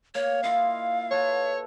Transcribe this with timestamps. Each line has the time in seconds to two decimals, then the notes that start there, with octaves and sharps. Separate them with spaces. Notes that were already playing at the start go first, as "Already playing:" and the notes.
0.15 A#3 C#5
0.43 E4 F4 D#5 F5
1.11 A4 B4 C#5 A5